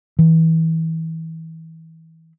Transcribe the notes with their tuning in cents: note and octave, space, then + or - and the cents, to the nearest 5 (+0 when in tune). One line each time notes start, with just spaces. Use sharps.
E3 -30